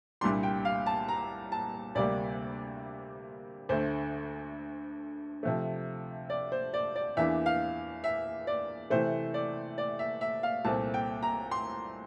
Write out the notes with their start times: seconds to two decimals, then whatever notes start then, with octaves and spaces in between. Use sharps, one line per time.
0.21 C2 A#2 G3 D4 C6
0.43 G5
0.65 F5
0.86 A5
1.08 A#5
1.52 A5
1.95 D2 C3 G3 A#3 D5
3.69 D2 D3 A3 C5
5.43 C3 F3 A3
6.30 D5
6.52 C5
6.74 D5
6.96 D5
7.17 E2 E3 A#3 D4 E5
7.46 F5
8.04 E5
8.47 D5
8.90 C3 E3 A3 C5
9.34 D5
9.78 D5
9.99 E5
10.21 E5
10.43 F5
10.65 C2 A#2 A3 C4 A5
10.94 G5
11.22 A#5
11.51 C6